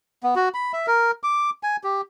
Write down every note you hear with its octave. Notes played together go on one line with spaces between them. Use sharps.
B3
F#4
B5
E5
A#4
D6
G#5
G4